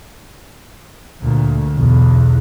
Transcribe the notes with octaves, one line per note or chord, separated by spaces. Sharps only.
D2 A#2
B1 E2